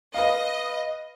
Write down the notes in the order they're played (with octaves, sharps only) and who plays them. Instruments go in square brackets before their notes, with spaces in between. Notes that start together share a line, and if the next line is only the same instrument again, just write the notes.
[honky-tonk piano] B4 F5 [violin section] D#5